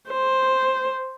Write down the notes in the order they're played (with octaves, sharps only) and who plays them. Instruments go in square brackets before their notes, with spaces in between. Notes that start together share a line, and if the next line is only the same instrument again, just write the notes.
[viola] C5